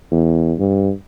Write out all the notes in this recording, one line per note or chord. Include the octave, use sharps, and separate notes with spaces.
E2
G2